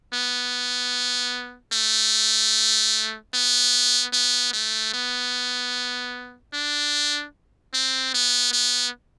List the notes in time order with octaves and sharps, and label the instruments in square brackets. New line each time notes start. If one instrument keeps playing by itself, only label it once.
[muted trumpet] B3
A3
B3
B3
A3
B3
D4
C4
B3
B3